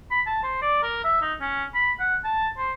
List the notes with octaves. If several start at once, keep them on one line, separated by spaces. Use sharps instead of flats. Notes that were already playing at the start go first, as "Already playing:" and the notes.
B5
A5
C5
D5
A#4
E5
D#4
C#4
B5
F#5
A5
C5